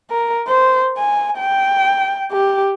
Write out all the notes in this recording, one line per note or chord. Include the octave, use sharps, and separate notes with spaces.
A#4
C5
G#5
G5
G4